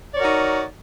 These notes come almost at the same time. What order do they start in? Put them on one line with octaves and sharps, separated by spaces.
D5 C#5 A#4 F#4 D#4